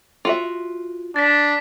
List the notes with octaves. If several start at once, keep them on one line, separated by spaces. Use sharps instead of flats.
F4 F#4 E5
D4 A6 B6